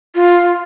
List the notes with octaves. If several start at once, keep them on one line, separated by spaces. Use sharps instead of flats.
F4